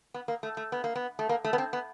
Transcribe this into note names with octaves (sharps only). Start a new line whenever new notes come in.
B3
A#3
A3
A3
B3
A#3
B3
A3
A#3
A3
B3
C4
B3